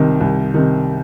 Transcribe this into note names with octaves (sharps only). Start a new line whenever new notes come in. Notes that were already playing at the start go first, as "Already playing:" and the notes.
Already playing: C2 C3 D#3
C2
C3 D#3